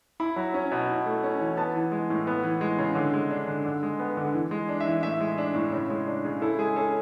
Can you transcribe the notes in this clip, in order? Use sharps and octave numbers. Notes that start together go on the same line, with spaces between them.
E4 B5
F#3
C#4
B2
E4
A3
C#4
E3
B3 A5
E3
G#3
A2
B3
E3
G#3
C#3
D3
G#3
D4
D3
D3
G#3
B3
D3
E3
G#3
D4
E5
E3
A2 E5
G#3
D4
A2
C#3
G#3
D4
C#3
E4 A4
G#3 G#4
C#4 A4